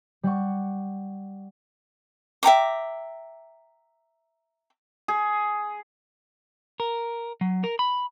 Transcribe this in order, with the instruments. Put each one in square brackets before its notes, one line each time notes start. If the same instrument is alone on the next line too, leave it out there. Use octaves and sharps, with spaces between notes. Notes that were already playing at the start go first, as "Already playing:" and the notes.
[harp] G3 F#5 C#6
[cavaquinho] E5 G5 A#5 D6
[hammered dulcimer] G#4
[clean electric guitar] A#4
F#3
A#4
B5